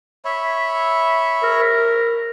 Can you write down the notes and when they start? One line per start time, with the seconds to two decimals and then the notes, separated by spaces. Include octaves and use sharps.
0.25 C#5 E5 B5
1.43 A#4